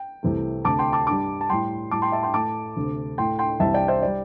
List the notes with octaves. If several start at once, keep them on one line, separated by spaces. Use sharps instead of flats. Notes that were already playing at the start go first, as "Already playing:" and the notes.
Already playing: G5
C2 C3 E3 A3
D2 C3 A3 A5 D6
G5 C6
A5 D6
G2 G3 A5 D6
A5
A2 G3 G5 C6
A2 G3 A5 D6
G5 C6
E5 A5
G5 C6
A2 A3 A5 D6
D2 C3 A3
A2 A3 G5 C6
G5 C6
C2 C3 E3 G3 E5 A5
D5 G5
C5 E5
G3 D5